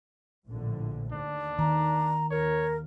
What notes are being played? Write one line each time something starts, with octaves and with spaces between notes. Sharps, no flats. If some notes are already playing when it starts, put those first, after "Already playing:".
A#1 A2 D3
D#2 D3 D4
D#3 A#5
D#2 A#4 C#5